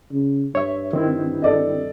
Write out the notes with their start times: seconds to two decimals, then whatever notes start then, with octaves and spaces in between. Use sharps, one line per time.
0.12 C#3
0.55 G2 C#5 E5
0.93 D#3 C4 E4
1.42 A4 D5 D#5